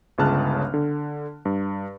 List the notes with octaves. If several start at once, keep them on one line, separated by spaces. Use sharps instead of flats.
G1 C#2 C#3 A5 F6 F#6
D3
G2